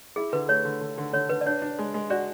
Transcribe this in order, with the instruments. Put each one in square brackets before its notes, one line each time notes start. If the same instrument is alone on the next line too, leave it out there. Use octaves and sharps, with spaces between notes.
[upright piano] E4 [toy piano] G#4
[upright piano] D3 [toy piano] B4
[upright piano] A3 [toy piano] C#5
[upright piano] D3
D3
D3
[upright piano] D3 [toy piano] C#5
[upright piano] D3 [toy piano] B4
[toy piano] D5
[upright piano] D4 [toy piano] C#5
[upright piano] D4
G#3
G#3
[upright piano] F#4 [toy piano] D5